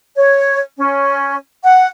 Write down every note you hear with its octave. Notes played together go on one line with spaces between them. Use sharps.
C#5
C#4
F#5